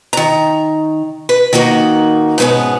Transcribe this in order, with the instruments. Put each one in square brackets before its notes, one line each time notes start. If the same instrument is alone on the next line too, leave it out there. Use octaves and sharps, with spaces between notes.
[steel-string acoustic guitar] D#3 A#5
B4
D#3 A#3 D#4 F#4
G#2 B2 B3 C#4 G#4